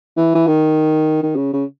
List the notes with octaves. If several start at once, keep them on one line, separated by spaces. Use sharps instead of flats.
E3
E3
D#3
D#3
C#3
C#3